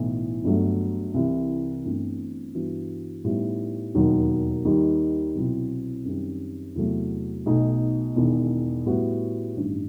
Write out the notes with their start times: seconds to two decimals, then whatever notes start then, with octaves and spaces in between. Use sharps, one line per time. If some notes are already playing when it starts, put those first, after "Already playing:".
Already playing: B1 A2 E3
0.44 G1 G2 F#3 A3
1.14 C2 C3 E3
1.85 G1 G2 E3 A3 C4
2.55 G2 E3 B3 F#4
3.24 A2 G3 B3 D#4
3.95 E1 D#2 D#3 F#3
4.65 D#2 D#3 G3 D#4
5.35 C2 B2 F#3 C4 E4
6.05 F#2 D#3 G3 C4
6.76 E2 C3 F#3 A3
7.46 B1 B2 A3 D#4
8.16 E1 E2 D#3
8.86 A2 G3 B3 F#4
9.56 A1 G2 D#3